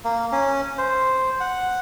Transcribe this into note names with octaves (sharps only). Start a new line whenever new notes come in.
A#3
C#4
C5
F#5